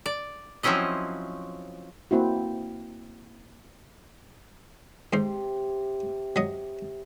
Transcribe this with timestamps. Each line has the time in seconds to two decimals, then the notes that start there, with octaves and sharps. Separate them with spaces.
0.06 D5
0.63 F3 F#3 C4 C#4 E4 D#5
2.11 A#3 C4 E4 F#4
5.13 G#2 C3 G4 C5
6.36 F#3 D#5